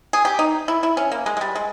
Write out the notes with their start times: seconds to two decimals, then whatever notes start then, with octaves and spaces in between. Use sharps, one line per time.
0.13 G#4
0.25 G4
0.39 D#4
0.68 E4
0.83 E4
0.97 C#4
1.12 A#3
1.26 G#3
1.37 G#3
1.41 G3
1.55 G#3